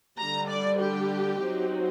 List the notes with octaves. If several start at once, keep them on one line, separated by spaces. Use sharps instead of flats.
D3 G3 D4 A#5
D5
G4
F#3 C4 D#4